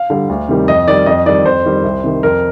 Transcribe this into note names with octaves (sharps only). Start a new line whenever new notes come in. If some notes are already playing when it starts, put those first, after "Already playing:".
Already playing: F5
D3 G3
D2
C3 D#3 G3
F2 D#5
D#3 G3 D5
F2 D#5
D#3 G3 D5
F2 C5
D#3 G3
C2
C3 D#3
F2 A#4